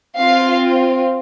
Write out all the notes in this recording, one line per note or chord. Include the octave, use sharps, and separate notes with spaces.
C4 F4 F5